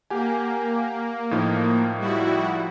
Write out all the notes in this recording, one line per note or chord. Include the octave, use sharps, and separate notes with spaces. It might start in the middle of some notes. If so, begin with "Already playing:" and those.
A#3 G4 F#5 G#5
A2 F3 D#4
G3 E4 F#4